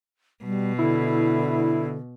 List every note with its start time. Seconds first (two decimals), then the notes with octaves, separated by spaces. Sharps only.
0.44 B2 G3
0.78 D3 E4